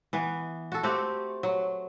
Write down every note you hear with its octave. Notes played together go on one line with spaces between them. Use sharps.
E3 B3
F#4 A4
A3 C4 F#4 G4
F#3